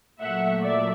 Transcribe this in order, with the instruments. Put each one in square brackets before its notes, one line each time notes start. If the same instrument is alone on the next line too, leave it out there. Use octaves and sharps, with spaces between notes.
[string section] A#2 F#3 A3 E5 F#5
D5 E5